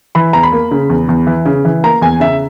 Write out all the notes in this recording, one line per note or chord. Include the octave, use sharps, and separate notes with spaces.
E3 B5
E2 A#5
B5
A#3
C#3
E2
E2
E3
C#3
E3
A#3 A#5
E2 G#5
C#3 E5